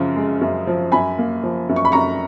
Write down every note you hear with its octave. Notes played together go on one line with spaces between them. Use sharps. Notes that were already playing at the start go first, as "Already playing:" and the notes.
Already playing: F#2 C#3 F3
G#3
F#2
F3
F#2 G#5 B5
A#3
F3
F#2
C#6
B5
F#2 A#5 C#6